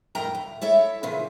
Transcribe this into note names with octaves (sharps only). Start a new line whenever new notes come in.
F2 A2 A#4 G5 A#5
D2
E4 A4 C#5 E5
A#2 C#3 E3 F3